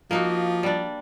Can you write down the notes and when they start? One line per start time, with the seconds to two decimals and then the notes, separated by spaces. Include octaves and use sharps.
0.11 F3 A#3 D#4 F#4
0.63 G3 D4